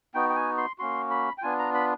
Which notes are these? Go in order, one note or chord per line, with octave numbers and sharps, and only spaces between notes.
B3 D#4 F#4 G5
G5
G#5
C6
A#3 C#4 F#4 C6
B5
G5
B3 D4 F4 G#5
A#5
B5